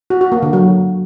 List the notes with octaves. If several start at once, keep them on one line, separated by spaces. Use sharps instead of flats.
F#4
F#4
A#3
D3
F#3